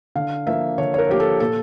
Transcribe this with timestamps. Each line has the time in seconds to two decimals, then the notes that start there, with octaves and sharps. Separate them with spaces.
0.15 D3 F5
0.47 F3 A#3 E5
0.78 D3 C#5
0.94 C#5
0.98 A#4
1.09 F3 A#3 G4
1.20 A4
1.40 A#2 A4